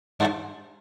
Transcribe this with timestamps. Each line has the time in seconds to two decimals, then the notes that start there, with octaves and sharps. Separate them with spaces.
0.20 G2